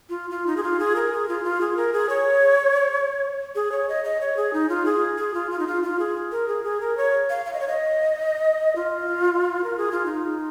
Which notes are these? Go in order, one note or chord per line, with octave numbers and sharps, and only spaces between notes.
F4
F4
D#4
G#4
F4
G#4
A#4
G#4
F4
F4
G#4
A#4
G#4
C#5
G#4
C#5
D#5
D#5
C#5
G#4
D#4
F4
G#4
G#4
F4
F4
D#4
F4
F4
G#4
A#4
G#4
G#4
A#4
C#5
F5
F5
D#5
C#5
D#5
F4
A#4
G#4
F4
D#4